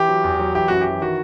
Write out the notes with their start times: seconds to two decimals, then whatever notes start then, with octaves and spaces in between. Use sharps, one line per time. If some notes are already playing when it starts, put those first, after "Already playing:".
Already playing: E3 G4
0.09 F#3
0.24 E2
0.39 F#3
0.55 E3 G4
0.68 F#2 F#4
0.81 G4
0.86 E3
1.02 D#3 F#4